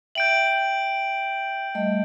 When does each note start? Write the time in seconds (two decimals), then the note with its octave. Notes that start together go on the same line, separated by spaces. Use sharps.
0.15 E5 G5 G6 D7 F#7
1.75 G3 A3 D#5